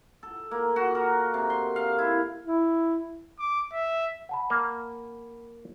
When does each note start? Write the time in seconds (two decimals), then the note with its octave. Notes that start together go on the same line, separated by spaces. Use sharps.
0.23 A4
0.51 A#3
0.76 F#4
0.95 A#4
1.34 C3
1.50 C6
1.76 F5
1.98 E4
2.44 E4
3.39 D6
3.73 E5
4.29 F#5 A5 B5
4.50 A#3